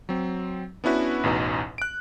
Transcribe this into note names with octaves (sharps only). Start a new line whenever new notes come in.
F#3 C4
B3 C#4 D4 E4 F#4 B4
A1 E2 B2 D#4
F#6 D7